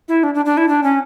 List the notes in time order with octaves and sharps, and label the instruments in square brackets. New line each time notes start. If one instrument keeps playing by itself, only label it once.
[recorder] E4
D4
D4
D4
E4
D4
C#4